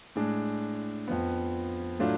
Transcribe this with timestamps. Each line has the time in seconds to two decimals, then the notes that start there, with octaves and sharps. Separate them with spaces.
0.16 A2 G#3 D4
1.08 F2 F3 B3
1.99 A2 F#3 A3 D4 F4